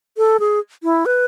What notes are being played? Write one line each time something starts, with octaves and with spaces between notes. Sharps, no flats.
A4
G#4
E4
B4